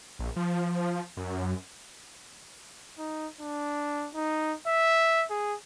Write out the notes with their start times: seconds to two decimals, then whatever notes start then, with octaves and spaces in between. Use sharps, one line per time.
0.19 A#1
0.36 F3
1.17 F#2
2.98 D#4
3.40 D4
4.15 D#4
4.67 E5
5.30 G#4